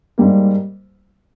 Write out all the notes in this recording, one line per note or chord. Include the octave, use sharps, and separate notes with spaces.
G#2 G3 A#3